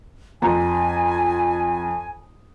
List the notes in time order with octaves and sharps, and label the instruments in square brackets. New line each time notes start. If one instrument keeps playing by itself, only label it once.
[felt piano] F2 A#5 [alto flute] G#5